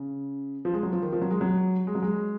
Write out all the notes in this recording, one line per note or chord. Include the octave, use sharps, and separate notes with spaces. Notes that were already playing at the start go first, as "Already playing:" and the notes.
Already playing: C#3
F3
G#3
F#3
F3
D#3
F3
F#3
G#3
F#3
G#3
F#3
G#3